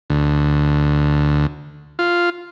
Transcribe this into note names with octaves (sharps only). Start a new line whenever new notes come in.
D2
F4